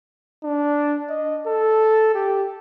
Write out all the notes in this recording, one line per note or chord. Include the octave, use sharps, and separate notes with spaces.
D4
D#5
A4
G4